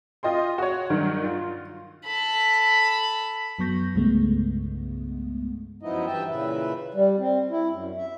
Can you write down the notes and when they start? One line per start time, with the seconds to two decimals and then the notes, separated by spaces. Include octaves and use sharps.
0.23 F4 D#5 G5 C6
0.58 F#4 C#5
0.90 G2 D#3 F#3
1.24 F4
2.06 A4 B5
3.59 F#2 F#3 B3 C#6 G6 A#6
3.95 C2 G2 C#3 G#3 A3 B3
5.83 F#2 F3 B3 D#4 E4 D#5
6.06 G2 E3 E5 G5 A5
6.29 A#2 C#3 E3 B4 E5
6.94 G3
7.18 C4
7.50 E4
7.70 F#2
7.97 E5